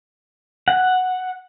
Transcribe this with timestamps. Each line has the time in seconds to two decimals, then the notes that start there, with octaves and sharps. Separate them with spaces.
0.68 F#5